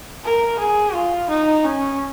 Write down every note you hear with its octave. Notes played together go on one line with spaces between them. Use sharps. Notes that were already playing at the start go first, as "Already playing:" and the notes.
A#4
G#4
F4
D#4
C#4